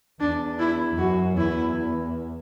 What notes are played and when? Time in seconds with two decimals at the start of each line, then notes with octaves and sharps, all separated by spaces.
0.20 E2 D4
0.59 E4
0.98 F#2 F#4
1.37 E2 E4